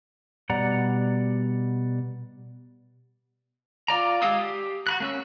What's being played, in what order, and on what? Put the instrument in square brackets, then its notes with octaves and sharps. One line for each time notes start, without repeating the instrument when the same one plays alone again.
[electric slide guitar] B2 G3 D5 F#5 A#5
[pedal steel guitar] F4 D5 A#5
G#3 G4 F5 D#6 E6
G4
F#4 B5 F#6
A#3 C#4 E6